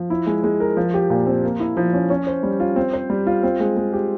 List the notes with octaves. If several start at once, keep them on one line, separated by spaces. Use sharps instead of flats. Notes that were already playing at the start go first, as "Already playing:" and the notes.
Already playing: F3
E4
G#3
G#3
A#4
F3
G4
A#2
C4
A#3
E4
F3
C#4
C#4
C5
G3
F4
C4
C5
G3
F4
C4
G#3
G#3
G4